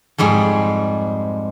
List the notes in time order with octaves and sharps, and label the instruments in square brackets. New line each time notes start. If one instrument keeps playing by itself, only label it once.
[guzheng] F2 G#2 G3 G#3